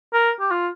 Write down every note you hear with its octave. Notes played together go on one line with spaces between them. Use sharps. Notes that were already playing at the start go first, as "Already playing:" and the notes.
A#4
G4
F4